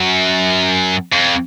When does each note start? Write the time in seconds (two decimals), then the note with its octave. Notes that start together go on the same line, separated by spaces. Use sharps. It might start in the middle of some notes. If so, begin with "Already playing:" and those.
Already playing: F#2
1.12 F2